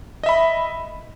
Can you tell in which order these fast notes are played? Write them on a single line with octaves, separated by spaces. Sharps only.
D#5 E5 B5